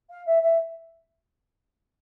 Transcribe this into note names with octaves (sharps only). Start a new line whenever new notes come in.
F5
E5
E5